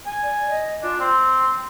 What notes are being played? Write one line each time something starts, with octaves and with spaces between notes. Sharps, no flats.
G#5
D5
D#5
D4 F4
C4 C6